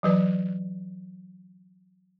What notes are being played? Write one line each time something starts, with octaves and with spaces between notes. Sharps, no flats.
E3 F#3 B4 D5